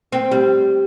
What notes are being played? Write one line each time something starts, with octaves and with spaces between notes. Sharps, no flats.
C4
G3